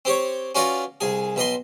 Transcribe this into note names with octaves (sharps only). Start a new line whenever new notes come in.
C4 G4 C#5
C#4 F4 F#4 B4 D5 A#5
C2 G#4
B1 B4 D#5 C6